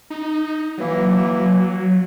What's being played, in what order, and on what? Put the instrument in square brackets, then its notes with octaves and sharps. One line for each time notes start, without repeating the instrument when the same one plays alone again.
[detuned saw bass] D#4
[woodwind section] E3 A#3 [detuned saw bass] F#3